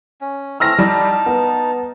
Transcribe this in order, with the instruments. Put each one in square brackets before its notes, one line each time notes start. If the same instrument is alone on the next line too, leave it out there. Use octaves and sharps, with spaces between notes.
[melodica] C#4
[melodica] A3 C4 [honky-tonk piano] E6 F6 A#6
[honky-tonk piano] G3 [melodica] D#4 A5
[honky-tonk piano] B3